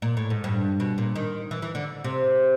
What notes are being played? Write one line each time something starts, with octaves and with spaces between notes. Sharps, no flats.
A#2
A2
G#2
G2
B2
A#2
D#3
E3
E3
D3
C3